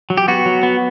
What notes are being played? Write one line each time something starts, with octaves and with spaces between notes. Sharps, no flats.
F#3
G4
B3 F#4
F#3
B3